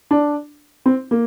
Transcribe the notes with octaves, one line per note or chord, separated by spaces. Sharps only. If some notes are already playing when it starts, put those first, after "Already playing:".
D4
C4
A#3